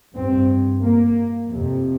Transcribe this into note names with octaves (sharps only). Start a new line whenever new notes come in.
G2 C4
A#3
F2 C3